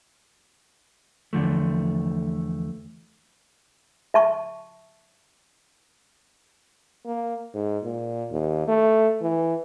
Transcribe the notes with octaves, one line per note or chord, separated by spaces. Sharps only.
E2 D3 F3 A3
E5 A5 C#6
A#3
G#2
A#2
D#2
A3
E3